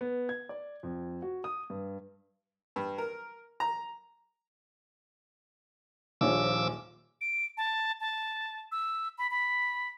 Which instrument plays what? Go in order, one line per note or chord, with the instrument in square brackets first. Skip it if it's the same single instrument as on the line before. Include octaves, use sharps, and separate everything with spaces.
[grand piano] B3
G#6
D5
F2
F#4
D#6
G2
[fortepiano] G2
A#4
A#5
[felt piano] D#1 A#1 C#5 [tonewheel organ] F3 D6 E6
[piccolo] D7
A5
A5
E6
B5
B5